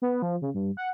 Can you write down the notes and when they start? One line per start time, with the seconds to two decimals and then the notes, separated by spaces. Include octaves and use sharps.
0.02 B3
0.22 F3
0.42 C#3
0.54 G2
0.77 F#5